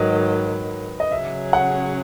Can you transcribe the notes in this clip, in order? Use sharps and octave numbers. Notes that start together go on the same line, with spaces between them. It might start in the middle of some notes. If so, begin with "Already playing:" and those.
Already playing: G#2 D#3 F#3 B4 D#5
D#5
C#3 F#3 C#4 G#4 E5
F#5